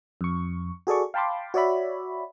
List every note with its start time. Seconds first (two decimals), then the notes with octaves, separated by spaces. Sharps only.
0.21 F2 C#6
0.87 F#4 G#4 A4 D5 C#6
1.14 F5 G5 A5 B5 C6 D6
1.54 F#4 C#5 D5 E5 B5